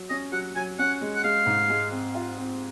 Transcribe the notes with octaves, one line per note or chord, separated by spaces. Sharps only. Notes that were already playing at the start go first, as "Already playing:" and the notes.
Already playing: F#3
C#4 D#5
F#3 F#5
F#3 G#5
C#4 F#5
G#3
F#5
G#3 F5
G#2
G#3
C4
F4
C4